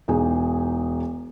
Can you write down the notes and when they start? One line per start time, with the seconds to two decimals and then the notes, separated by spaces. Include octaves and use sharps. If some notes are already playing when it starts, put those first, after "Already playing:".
0.08 E1 D#4 G#4 G#5